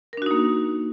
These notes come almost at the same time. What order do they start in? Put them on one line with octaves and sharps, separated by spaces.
A#4 D4 F#4 D#4 A#3